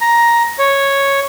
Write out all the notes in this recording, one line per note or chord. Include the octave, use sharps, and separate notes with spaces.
A#5
C#5